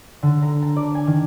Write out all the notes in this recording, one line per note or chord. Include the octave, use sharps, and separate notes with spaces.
D3
A#5
A5
D5
G#5
D#3